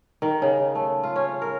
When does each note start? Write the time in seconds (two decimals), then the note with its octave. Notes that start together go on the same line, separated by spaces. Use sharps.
0.22 D#3
0.42 C#3
0.75 A3
1.03 F4
1.16 C#4
1.42 A#4